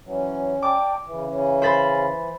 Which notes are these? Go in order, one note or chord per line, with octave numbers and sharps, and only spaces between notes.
E3 F#3 C#4
D5 G5 A5 D6
C#3 E3
C#3 C#4
C5 B5 A6